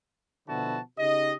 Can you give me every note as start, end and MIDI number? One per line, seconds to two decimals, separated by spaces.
0.48 0.79 47
0.48 0.79 50
0.48 0.79 53
0.48 0.79 64
0.48 0.79 66
0.48 0.79 81
0.98 1.35 49
0.98 1.35 63
0.98 1.35 67
0.98 1.35 75